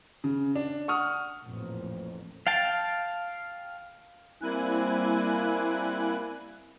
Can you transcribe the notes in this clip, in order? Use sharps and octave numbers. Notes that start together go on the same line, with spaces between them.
C#3
D4
F#5 C#6 D#6 F6
A1 F2 A#2
F5 G5 A5
G3 A#3 C4 E4 G#5 F#6